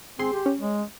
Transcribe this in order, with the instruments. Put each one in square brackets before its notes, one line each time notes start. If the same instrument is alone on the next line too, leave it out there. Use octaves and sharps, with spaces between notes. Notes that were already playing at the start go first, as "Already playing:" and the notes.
[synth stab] G#1 G#4 C6 [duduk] C4
[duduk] G4
[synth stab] C#4
[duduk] G#3